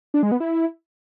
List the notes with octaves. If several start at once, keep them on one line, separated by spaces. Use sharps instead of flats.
D4
G#3
B3
E4